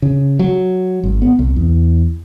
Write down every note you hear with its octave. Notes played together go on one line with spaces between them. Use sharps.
C#3
F#3
G#1
B3
C2
E2